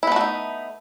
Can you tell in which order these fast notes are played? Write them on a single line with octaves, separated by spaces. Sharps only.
E4 B3 A3 F#4 D#4